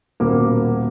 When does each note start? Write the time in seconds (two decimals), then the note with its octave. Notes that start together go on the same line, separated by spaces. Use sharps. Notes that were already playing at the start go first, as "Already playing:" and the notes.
0.20 D#1 B2 A#3 D6